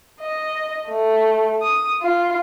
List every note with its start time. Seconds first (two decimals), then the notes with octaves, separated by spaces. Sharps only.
0.20 D#5
0.88 A3
1.62 D#6
2.02 F4